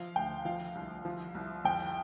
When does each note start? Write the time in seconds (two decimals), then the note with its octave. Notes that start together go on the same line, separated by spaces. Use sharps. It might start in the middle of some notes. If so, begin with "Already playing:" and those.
Already playing: F3 F5
0.16 D2 G5
0.45 F3 F5
0.75 C2
1.05 F3
1.35 C2
1.64 F2 G5